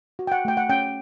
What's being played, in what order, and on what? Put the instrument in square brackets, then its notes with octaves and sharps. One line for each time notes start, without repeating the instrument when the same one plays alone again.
[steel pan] F#4
G5
F#5
A3 G5
F#5
C#4 G5